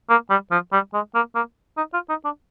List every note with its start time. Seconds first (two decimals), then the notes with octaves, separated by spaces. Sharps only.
0.10 A#3
0.30 G3
0.51 F3
0.72 G3
0.93 G#3
1.15 A#3
1.35 A#3
1.77 D#4
1.93 F4
2.09 D#4
2.25 D4